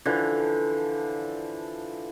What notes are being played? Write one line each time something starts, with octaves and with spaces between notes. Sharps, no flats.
D3 E3 F3